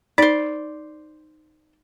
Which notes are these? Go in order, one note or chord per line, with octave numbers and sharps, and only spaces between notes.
D#4 C5 D5